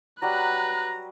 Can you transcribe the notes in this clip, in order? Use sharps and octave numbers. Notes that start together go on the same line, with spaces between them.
F#3 G3 B4 A#5 F#6